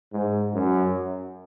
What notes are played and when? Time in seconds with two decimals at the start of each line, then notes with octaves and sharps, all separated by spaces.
0.13 G#2
0.55 F#2